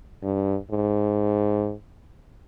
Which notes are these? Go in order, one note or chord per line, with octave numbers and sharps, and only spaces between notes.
G2
G#2